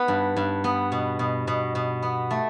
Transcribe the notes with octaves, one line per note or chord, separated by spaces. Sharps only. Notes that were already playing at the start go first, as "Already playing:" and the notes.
Already playing: B3 B4
G2
G2
B3
B2
B2
B2
B2
B3
A3